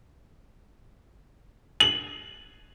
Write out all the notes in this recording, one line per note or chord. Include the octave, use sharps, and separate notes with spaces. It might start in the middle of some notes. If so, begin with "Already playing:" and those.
F#7